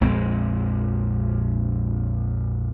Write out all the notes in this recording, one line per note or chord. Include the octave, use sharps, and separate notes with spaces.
A#1 F2 G#3 C4